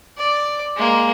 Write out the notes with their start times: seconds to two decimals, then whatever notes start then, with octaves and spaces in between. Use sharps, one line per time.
0.18 D5
0.77 G#3 A#3